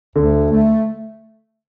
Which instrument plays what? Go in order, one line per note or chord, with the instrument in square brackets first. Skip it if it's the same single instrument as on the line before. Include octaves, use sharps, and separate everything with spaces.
[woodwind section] D2 [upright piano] D3
[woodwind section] A3